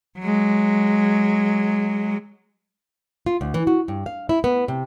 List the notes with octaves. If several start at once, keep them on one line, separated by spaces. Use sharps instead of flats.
F#3 G#3
F4
D2
E3
F#4
G2
F5
E4
B3
C3